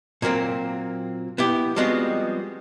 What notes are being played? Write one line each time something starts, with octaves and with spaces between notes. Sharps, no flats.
A#2 F#3 A#3 C4
B3 E4 G4
F3 G3 G#3 B3 C4 F#4